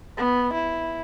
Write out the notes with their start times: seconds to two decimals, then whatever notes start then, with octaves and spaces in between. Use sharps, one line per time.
0.17 B3
0.54 E4